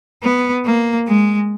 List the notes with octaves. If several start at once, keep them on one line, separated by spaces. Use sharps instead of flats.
B3
A#3
G#3